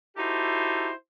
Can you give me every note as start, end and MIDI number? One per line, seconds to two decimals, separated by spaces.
0.16 0.90 63
0.16 0.90 64
0.16 0.90 66
0.16 0.90 67
0.16 0.90 69
0.16 0.90 72